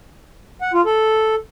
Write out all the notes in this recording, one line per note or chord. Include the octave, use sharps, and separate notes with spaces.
F#5
F4
A4